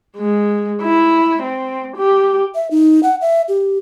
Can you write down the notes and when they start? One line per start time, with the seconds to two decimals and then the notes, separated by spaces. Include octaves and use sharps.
0.16 G#3
0.82 E4
1.43 C4
1.97 G4
2.55 E5
2.71 D#4
3.03 F#5
3.21 E5
3.48 G4